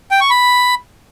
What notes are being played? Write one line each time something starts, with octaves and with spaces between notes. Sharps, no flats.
G5
C#6
B5